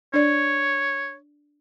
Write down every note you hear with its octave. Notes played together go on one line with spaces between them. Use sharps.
D4 C#5 D5